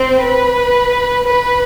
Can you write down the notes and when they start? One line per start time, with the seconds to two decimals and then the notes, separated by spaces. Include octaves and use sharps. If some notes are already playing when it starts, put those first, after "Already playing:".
Already playing: C4 C5
0.22 B4
1.26 B4